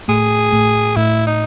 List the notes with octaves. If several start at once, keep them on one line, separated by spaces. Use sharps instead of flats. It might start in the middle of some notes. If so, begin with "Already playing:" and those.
A2 A3 G#4
A2 A3
A2 A3 E4
D#4